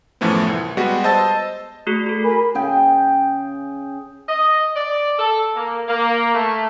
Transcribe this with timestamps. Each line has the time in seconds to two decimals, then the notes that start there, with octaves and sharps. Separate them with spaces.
0.21 F#2 A2 E3 F3 A3 B3
0.47 C2
0.77 G3 G#3 B3 F#4
1.04 C5 D#5 A5 E6 A6
1.87 A3 F#4 G#4
2.06 F#4 A4
2.22 A#4 G#5 B5
2.55 C#3 G#4 G5
4.28 D#5
4.75 D5
5.18 A4
5.55 A#3
5.88 A#3
6.34 A3